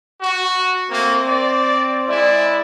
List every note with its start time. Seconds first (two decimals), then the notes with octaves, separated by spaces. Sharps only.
0.21 F#4
0.90 A3 A#3 C4
1.27 D5
2.07 G#3 E4 D5